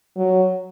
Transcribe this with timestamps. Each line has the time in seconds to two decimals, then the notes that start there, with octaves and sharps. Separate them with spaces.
0.16 F#3